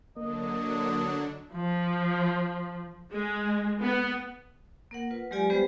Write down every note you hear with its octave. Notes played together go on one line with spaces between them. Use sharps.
D3 F#3 A#3 D4 D#5
F3
G#3
B3
A#3 A#4 F#5
F4 B4
F#3 G#3 F4 G4 D5 G#5
G3 B3 G4 B4 C5